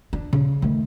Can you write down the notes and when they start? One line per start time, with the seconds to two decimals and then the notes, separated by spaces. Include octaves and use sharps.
0.13 D4
0.33 C#3
0.62 D#3 A3